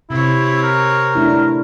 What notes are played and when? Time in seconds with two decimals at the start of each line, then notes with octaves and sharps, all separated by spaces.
0.10 C3 C4 E4 C#5
0.63 A#4
1.15 A3 D4 E4